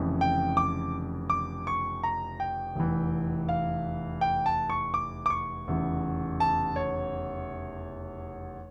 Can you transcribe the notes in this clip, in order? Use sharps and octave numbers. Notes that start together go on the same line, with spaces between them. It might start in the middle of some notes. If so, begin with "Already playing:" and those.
Already playing: F1 F2 C#3 E3
G5
D6
D6
C#6
A#5
G5
F1 E2 E3
F5
G5
A5
C#6
D6
D6
C#6
F1 E2 C#3 E3
A5
C#5